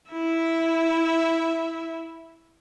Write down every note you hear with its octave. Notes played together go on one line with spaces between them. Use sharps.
E4 E5